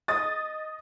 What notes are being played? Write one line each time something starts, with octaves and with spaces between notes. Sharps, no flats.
D#5 D#6 A6